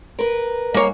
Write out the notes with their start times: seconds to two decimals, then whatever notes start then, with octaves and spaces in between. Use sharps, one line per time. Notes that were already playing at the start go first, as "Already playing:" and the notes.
0.19 A#4 B4
0.74 G#2 A#3 C#5